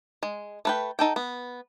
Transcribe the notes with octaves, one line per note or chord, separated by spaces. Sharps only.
G#3
A3 B4 G5
D#4 A4 G5
B3